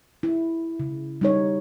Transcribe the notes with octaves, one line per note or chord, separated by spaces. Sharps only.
E4
C#3
G3 D#4 C#5